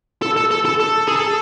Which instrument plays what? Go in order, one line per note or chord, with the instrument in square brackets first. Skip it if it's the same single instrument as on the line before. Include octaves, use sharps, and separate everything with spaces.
[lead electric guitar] A4
A4
A4
A4
A4
G#4
A4